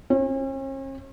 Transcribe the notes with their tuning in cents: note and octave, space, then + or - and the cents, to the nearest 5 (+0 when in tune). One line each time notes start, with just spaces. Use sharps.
C#4 -45